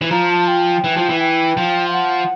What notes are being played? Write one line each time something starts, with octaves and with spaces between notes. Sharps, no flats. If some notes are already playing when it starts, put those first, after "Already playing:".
E3
F3 A#5
A5
G5
E3
F3
E3
G5
F3
F5
F#5